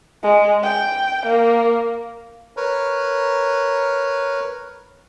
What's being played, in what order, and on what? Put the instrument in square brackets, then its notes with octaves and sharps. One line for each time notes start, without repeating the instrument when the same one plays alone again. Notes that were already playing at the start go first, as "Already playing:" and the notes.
[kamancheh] G#3
G5
A#3
[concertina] A#4 B4 C#5